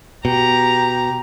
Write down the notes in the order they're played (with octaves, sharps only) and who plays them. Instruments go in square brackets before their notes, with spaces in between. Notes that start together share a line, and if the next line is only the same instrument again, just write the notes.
[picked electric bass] B2 [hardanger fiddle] G4 A#5